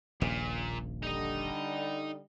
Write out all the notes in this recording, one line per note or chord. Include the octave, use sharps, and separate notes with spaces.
D#1 A#1 A#2 C#3
D3 G3 D#4 D#5